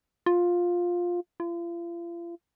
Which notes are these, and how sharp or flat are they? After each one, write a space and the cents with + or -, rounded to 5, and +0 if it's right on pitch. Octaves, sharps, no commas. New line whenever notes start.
F4 +10
F4 -40